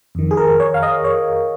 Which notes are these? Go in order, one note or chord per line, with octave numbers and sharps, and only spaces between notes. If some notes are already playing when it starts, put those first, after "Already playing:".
F2 D#3
G#4
A#4
C#5
F5
D#5
C#5